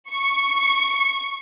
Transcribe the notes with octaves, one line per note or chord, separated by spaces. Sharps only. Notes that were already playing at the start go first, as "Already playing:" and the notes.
C#6